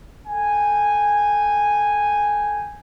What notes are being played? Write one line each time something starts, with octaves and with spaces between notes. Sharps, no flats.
A4 G5 G#5